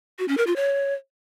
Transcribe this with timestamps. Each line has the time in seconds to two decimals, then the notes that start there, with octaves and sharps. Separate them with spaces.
0.19 F#4
0.28 C#4
0.37 A#4
0.47 F4
0.56 C#5